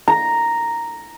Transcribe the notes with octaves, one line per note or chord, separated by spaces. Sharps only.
A#5